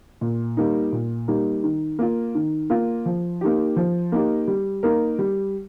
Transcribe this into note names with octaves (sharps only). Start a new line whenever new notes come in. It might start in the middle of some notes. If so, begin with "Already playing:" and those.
A#2
G3 A#3 D#4
A#2
G3 A#3 D#4
D#3
A#3 F4
D#3
A#3 F4
F3
A#3 D#4 G4
F3
A#3 D#4 G4
G3
A#3 D#4 A#4
G3